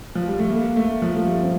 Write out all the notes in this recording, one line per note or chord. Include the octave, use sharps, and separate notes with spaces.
F3
G3
A3
A#3
A3
F3
A3
G3
C4